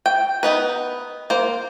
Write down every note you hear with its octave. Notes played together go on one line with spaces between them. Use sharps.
G5
B3 D#4 B4
A#3 C5